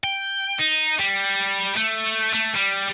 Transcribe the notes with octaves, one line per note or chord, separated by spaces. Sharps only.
G5
D#4
G3
A3
A3
G3